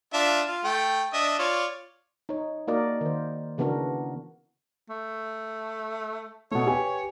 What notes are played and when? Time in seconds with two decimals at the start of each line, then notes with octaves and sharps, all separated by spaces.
0.14 D4 F4 E5
0.48 F4
0.64 A3 G5
1.13 D4 D#5 E5
1.39 F4 C#5 D5
2.29 D#4 C#5
2.68 A#3 D#4 F#4 A#4 D5 D#5
3.01 D#3 C5
3.58 C#3 E3 B3 D4 F#4 A#4
4.89 A3
6.51 B2 A3 C#5
6.67 G4 B4 G#5